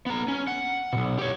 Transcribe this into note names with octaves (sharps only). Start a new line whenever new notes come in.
B3 A#5
C#4
F#5
B1 B2
G4 C#5